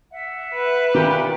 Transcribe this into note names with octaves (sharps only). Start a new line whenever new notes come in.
E5 F#5
B4
A#2 D#3 G4